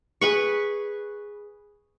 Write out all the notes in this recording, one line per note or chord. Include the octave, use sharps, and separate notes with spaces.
G#4 B4 C#6